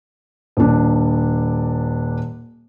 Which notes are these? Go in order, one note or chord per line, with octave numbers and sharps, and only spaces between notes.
D#1 D4